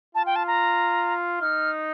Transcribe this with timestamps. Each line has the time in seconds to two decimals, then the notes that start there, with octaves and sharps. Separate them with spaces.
0.15 F4 A5
0.26 G5
0.36 A5
0.47 A#5
1.41 D#4 F6